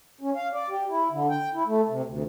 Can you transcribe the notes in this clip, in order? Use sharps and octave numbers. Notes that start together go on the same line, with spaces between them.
C#4
F5
D5
G4
E4
D3
G5
E4
A3
C3
D2